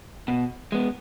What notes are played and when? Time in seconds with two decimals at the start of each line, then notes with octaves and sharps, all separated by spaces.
0.28 B2
0.72 G#3 B3